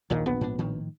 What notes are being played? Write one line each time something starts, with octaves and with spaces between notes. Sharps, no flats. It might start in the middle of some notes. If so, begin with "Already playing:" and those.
A#1 D#2 A#2 D#3
A#1 B3
G#2 D4
A2 D#3 F3